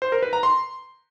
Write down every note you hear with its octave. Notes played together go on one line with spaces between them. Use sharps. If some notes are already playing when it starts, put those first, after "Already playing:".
C5
A#4
B4
A#5
C6